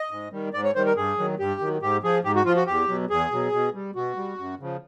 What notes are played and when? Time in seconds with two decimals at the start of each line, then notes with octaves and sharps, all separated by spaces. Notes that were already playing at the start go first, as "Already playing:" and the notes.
Already playing: D#5
0.11 G#2
0.32 D#3 G3
0.54 G#2 D5
0.64 C#5
0.75 D#3 G3 C5
0.86 A#4
0.96 G2 G#4
1.18 D#3 F#3
1.39 G2 G4
1.61 D#3 F#3
1.81 G#2 G4
2.03 F3 G#4
2.24 G#2 G4
2.35 F#4
2.45 F3 F4
2.56 F#4
2.67 E2 G4
2.88 B2 F#3
3.10 E2 G#4
3.32 B2 F#3
3.52 B2
3.74 G3
3.95 B2 F#4
4.16 G3
4.38 F#2
4.60 C#3 F3